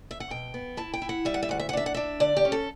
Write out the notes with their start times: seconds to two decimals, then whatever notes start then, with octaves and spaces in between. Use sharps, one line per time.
0.11 E5
0.20 F#5
0.30 B2 G5
0.54 B3
0.77 E4 A5
0.94 G5
1.02 E4
1.09 F#5
1.25 G3 E5
1.34 F#5
1.43 E5
1.49 D2 F#5
1.60 E5
1.69 F#5
1.73 D4 E5
1.86 F#5
1.94 D4 E5
2.20 D3 D5
2.37 G4
2.45 C#4
2.52 A4